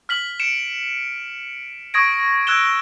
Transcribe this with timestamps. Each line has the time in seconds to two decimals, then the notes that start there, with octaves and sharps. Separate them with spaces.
0.09 F6 B6 F#7
0.40 C#7 D7 E7
1.94 C#6 D#6 G#6 A#6 D7
2.47 E6 F#6 G#6 D7 E7 G7